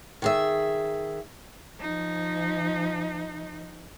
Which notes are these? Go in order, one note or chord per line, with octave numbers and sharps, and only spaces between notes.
D#3 G#4 E5
F3 D#4